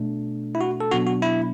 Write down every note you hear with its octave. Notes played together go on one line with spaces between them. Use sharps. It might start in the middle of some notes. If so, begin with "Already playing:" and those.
Already playing: B2 A3 D4
E4
F#4
A4
B2 F#3 B3 D4 F#4
F#4
E4